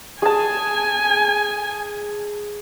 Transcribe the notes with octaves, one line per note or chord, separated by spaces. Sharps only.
G#4 G#5 A5